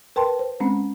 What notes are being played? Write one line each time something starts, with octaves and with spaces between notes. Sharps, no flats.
A#4 B4 G5 A5 C6
C5
G#3 C4 C#4